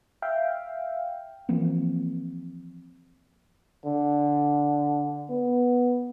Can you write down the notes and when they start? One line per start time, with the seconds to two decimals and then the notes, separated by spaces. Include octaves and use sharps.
0.22 E5 F5 G5
1.49 E3 F3 A#3 C4
3.85 D3
5.29 B3